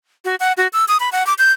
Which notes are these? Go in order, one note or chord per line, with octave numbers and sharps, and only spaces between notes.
F#4
F#5
F#4
E6
D#6
B5
F#5
D6
G6